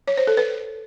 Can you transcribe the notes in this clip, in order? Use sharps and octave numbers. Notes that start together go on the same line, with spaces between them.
C#5
C5
A4
B4